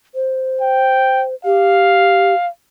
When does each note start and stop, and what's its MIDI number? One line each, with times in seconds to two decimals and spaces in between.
0.15 1.34 72
0.61 1.24 79
1.45 2.34 67
1.45 2.47 77